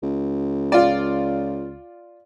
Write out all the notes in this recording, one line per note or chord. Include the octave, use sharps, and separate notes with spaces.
C#2
F4 D5